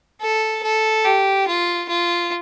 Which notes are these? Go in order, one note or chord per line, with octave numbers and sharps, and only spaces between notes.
A4
A4
G4
F4
F4